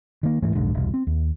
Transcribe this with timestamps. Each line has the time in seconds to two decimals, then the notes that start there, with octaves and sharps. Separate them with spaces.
0.23 D#3 A#3
0.42 D#1 G#2 E3 A3
0.55 F1 B1 G#2 D3
0.74 E1 C2
0.94 C4
1.07 D#2